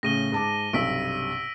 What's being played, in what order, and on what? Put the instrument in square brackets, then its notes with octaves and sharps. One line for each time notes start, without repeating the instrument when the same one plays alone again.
[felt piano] A2 C#3 [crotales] A#6 D#7 G7
[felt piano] G#2 A5 D6
[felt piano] B1 G2 C3 [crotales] E6 B6 D7